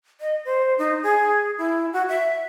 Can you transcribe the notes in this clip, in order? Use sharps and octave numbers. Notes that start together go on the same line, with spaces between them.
D#5
C5
D#4
G#4
E4
F#4
E5